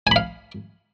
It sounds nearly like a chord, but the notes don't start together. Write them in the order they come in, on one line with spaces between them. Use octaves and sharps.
G#5 B5 F5